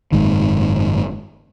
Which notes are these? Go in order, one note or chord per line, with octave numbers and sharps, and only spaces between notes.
F#1 B1 G#2 D#3